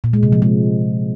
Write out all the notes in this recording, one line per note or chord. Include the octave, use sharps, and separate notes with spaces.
A#2
G#3
C3
F3
G#3